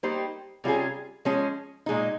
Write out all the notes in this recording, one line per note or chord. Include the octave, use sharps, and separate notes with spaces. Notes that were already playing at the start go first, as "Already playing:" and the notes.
G3 A#3 D#4 G4 C5
C3 G3 C#4 F4 G#4
F3 G#3 C#4 G#4
A#2 G#3 D#4